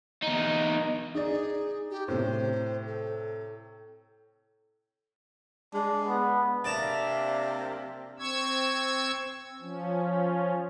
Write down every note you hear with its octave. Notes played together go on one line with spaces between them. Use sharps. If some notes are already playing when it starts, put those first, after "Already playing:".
E2 D#4
D#4 G#4 D5
G4
A2 C3 C5
A4
G#3 D4
B3
C3 A#3 D4 D5 E5 A5 A#5
C4 C#6 E6 G#6
F3 C#4